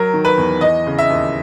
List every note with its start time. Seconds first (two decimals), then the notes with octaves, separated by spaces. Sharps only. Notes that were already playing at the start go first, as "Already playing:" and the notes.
Already playing: F#3 A#4
0.13 D#3
0.25 B4
0.38 E2
0.61 E3 D#5
0.87 C#3
0.99 E5
1.10 D#2